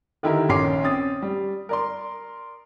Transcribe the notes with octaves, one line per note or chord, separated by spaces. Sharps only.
D3 D#3 D#4 E4 G4 A#4
A#1 D#3 C#4 C6 D6 C7
C4 C#4 D#6 A6
G3
A#4 D5 C6